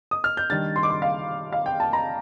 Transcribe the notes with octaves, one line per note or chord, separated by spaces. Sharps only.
D#6
F6
G6
D#3 G3 D4 A6
C6
D6
C6
F5
F5
G5
A5
A#5